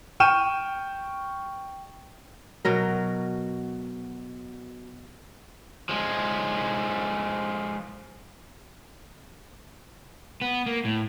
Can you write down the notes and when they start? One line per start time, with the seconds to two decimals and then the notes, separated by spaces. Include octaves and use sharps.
0.20 G5 C#6 F6 D#7 E7
2.65 B2 F#3 A#4
5.89 F3 G#3
10.42 B3
10.66 A#3
10.85 A2